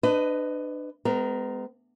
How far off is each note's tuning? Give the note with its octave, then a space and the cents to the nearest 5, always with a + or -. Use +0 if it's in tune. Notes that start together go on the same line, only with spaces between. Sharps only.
D4 +30 B4 +25 D#5 +0
G#3 +0 B3 +40 A#4 +0